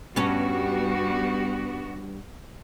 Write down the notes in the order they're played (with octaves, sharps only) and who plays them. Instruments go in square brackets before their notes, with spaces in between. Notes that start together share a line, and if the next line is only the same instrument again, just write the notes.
[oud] G2 C#4 [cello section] G3 B3 F#4